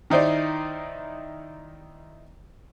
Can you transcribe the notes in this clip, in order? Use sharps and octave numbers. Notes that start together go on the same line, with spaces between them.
D#3 D#4 E4 C5 D5